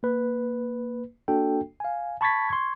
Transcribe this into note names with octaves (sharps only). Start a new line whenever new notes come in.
A#3 B4
A#3 D4 F#4 A4 G5
F5 G#5
A5 B5 C#6 G#6 A6 B6
C6 C#6 G#6